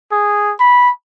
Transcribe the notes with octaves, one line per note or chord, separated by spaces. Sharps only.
G#4
B5